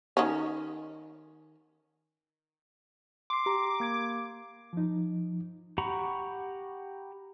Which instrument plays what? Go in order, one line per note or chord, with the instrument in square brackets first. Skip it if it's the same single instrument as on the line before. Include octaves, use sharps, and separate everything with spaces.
[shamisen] D#3 C#4
[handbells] C6 C7 [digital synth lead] D6
[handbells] G4 A#5
A#3 G#6 D7
[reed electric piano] F3 D#4
[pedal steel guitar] G4 F#5 A#5 B5 C#6